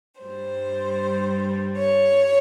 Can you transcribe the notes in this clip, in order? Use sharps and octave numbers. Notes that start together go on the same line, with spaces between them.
G2 G3 C5
C#5